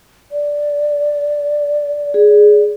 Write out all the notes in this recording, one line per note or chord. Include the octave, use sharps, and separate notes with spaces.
D5
G#4